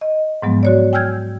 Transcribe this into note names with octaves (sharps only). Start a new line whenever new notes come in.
D#5
G#2 F3 F#3 G#3 B3
F#4 C#5 D5
G5 G#5 E6 F6 G6 G#6